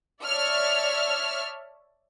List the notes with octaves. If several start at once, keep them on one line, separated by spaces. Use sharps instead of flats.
C#5 D5 E5 A5 F6